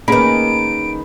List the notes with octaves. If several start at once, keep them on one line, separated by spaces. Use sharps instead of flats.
D#3 A#3 C#4 G#4 B4 B5 D7